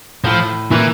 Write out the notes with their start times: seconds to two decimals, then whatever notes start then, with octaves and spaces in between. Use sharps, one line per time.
0.25 A2 F3
0.71 A#2 E3